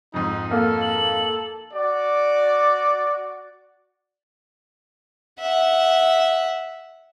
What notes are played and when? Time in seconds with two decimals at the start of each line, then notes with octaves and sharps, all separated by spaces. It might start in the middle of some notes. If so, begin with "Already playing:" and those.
0.14 F2 G#2 D#4
0.51 A#3 A4 F6
0.81 F#7
1.73 F#4 D5
5.40 E5 F#5